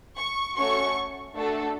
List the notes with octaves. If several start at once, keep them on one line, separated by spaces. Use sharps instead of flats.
C#6
A3 C#4 F#4 C#6
A3 D4 F#4 A4